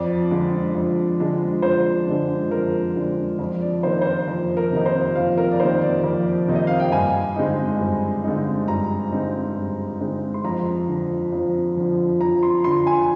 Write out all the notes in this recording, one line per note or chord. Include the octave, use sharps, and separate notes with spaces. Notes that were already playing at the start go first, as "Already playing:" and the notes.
Already playing: F2 D5
D3 G#3 D4
F2
D3 G#3 D4
F2 C5
D3 G#3 D4
F2 A#4
D3 G#3 D4
F2
D5
C3 D#3 A#3 D#4 C5
C5
A#4
F2
A#4
C3 D#3 A#3 D#4
C5
F2 F5
A#4
D5
C3 D#3 A#3 D#4 C5
D5
F2
C3 D#3 A#3 D#4
D#5
F5
G5
G2 G#5
D3 G#3 C4 D#4
G2
D3 G#3 C4 D#4
G2 A#5
D3 G#3 C4 D#4
G2
D3 G#3 C4 D#4
C6
F2 A#5
D3 F3
F2
D3 F3
F2 A#5
C6
D3 F3 C6
G#5